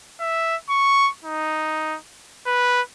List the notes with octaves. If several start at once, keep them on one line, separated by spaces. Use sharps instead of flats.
E5
C#6
D#4
B4